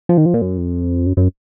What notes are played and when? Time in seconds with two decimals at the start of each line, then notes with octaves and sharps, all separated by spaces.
0.09 F3
0.17 D#3
0.26 F3
0.34 A#2
0.42 F#2
0.57 F2
1.06 F#2
1.17 F#2